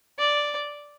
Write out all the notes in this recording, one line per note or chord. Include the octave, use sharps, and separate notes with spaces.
D5